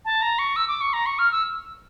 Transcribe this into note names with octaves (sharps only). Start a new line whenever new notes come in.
A5
A#5
C#6
E6
D6
C#6
A#5
C#6
F6
E6